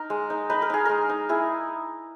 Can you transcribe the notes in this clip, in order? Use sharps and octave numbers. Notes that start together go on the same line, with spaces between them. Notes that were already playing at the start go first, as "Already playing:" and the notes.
Already playing: D#4 A#4
G#3
D#4
D#4 B4
A#4
D#4 G#4
G#3 A#4
D#4
E4 G#4